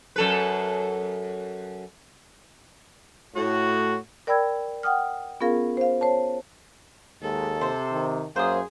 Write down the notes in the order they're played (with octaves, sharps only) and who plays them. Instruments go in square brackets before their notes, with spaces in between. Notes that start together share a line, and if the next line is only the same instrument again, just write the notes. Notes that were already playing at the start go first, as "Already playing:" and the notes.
[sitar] F#2 A4 B4
[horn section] A2 F#4
[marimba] A#4 D5 G5 B5 E6 G#6
F#5 G5 D#6 F6
B3 C#4 F4 G#4 A#4 F5
C5 F5
C5 C#5 A5
[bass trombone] D#2 [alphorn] G#3 [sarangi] A4
[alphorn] C3 [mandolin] C5
[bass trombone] D#3
[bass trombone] F#2 [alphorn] A#3 [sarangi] G#4 [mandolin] C5 D#6